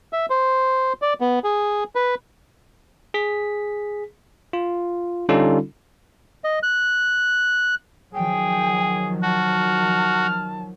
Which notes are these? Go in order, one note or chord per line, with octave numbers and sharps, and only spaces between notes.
E5
C5
D5
B3
G#4
B4
G#4 B6
F4
D3 G3 C#4 D#4 F4 A4
D#5
F#6
D#3 F3 F#3 G#4 G5
F#4 A5 F6